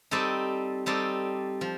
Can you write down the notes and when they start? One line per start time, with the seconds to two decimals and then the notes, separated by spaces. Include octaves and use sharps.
0.11 G3 C4 D#4 A4 D5
0.86 G3 C4 D#4 A4 D5
1.61 F3